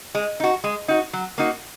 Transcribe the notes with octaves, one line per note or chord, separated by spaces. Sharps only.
G#3
D#4 F#4
G#3
D#4 F#4
F#3
A#3 D#4 F#4